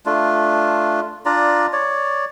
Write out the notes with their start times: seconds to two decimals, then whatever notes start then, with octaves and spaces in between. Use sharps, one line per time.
0.06 A3 D4 F4
1.25 D4 F4 D5 A#5
1.73 C#5 D5